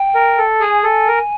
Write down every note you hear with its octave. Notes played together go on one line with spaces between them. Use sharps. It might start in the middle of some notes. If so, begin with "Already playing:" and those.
Already playing: G5
A#4
A4
G#4 G#5
A4
A#4